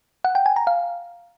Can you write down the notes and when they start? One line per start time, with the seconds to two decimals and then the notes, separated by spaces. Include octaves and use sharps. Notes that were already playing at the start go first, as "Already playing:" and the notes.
0.25 F#5
0.35 G5
0.46 G#5
0.56 A#5
0.67 F5